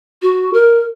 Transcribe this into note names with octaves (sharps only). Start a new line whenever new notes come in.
F#4
A#4